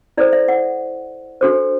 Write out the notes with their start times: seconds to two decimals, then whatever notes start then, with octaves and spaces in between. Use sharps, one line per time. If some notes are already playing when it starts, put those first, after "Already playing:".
0.17 E4 A4 C5 D5
0.33 E5
0.48 F#5
1.41 D4 F#4 A4 C5